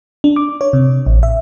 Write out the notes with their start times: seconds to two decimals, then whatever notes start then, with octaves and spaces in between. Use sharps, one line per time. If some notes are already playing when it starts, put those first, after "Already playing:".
0.24 D4
0.36 D6
0.61 C#5
0.73 C3
1.07 A1
1.23 E5